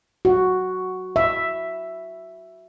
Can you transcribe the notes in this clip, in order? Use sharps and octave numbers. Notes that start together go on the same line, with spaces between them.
F#4
E5